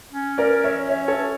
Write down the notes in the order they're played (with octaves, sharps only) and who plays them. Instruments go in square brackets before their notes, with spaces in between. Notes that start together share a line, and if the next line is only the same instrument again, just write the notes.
[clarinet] C#4
[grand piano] A#4 D5
C#5 E5
C#5 E5
A4 C#5